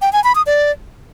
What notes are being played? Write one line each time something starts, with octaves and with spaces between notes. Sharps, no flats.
G5
G#5
B5
D#6
D5